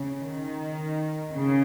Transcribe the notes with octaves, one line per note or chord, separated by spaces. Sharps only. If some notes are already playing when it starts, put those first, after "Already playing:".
Already playing: C#3
D#3
C#3